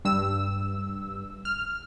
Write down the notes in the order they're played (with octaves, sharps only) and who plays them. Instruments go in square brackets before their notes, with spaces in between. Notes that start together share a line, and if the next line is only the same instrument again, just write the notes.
[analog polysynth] G2 E6
F6